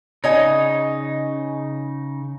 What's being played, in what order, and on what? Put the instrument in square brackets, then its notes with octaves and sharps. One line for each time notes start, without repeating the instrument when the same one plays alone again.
[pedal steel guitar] C#3 D#4 [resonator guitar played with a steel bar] C#5 D#5 G#5